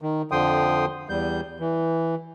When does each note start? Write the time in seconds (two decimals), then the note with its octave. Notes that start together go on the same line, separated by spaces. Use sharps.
0.02 D#3
0.32 F2 D3 F3 G5 C6 D#6
1.09 E2 G3 G6
1.60 E3